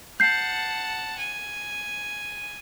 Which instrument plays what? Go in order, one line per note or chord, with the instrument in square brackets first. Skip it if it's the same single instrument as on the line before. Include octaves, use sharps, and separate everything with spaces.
[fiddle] F#5 A5 [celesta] G6 C7
[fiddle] G#5